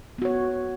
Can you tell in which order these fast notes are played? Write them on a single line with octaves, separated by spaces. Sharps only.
B3 F#4 C#5